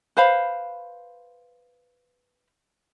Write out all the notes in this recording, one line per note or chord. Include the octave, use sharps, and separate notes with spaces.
B4 C5 F5 B5